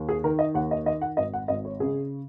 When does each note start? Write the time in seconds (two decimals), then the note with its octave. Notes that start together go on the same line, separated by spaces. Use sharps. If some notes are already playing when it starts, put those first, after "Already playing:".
Already playing: D#2
0.09 G#4
0.24 D#3 A#4
0.39 D#5
0.54 D#2 F#5
0.71 D#5
0.86 D#3 D#5
1.01 F#5
1.17 G#1 D#5
1.33 F#5
1.48 G#1 D#5
1.65 C#5
1.80 C#3 G#4